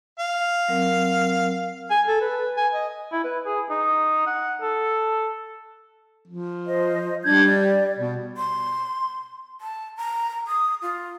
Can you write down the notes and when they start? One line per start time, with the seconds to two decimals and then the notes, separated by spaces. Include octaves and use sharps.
0.19 F5
0.68 F#3 C4 A#4
1.91 G#5
2.07 A4
2.21 B4
2.57 G#5
2.73 D#5
3.12 E4
3.24 B4
3.46 G#4
3.69 D#4
4.27 F#5
4.62 A4
6.28 F3
6.66 C5 D#5
7.24 G3 D4 G6 G#6
7.44 D5
7.99 B2
8.37 C6
9.61 A5
9.97 A#5
10.47 D#6
10.82 F4